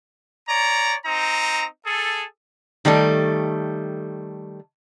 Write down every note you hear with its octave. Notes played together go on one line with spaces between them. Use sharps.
C#5 D5 A#5
C4 D#4 A#5
G#4 A4
D#3 G3 A3 A4